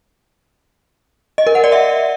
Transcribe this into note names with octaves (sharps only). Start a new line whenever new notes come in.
D#5
A#4
F#5
D5
E5